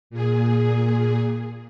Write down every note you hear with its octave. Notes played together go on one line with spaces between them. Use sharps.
A#2 G#4